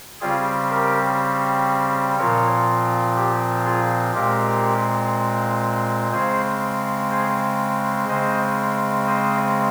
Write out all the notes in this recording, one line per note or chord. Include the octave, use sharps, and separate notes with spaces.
C#3 G3 C4 F4 G#4
G4 A#4
A#2 F3 C4 A#4 C#5
G4
F4 G#4
A#2 G#3 C4 G4 A#4
C#3 G#3 C4 G#4 C5
G#4 C5
C#3 G#3 C4 C5 D#5
C5 D#5